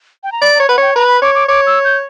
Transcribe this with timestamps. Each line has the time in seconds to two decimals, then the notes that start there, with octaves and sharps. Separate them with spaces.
0.23 G5
0.32 A#5
0.41 D5 B5
0.55 A#5
0.59 C#5
0.69 B4 F#5
0.78 C#5 G5
0.95 B4 A#5
1.08 B5
1.22 C#5 D6
1.35 D6
1.48 C#5 D6
1.67 E6
1.84 G6